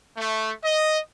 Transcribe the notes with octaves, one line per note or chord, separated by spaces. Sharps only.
A3
D#5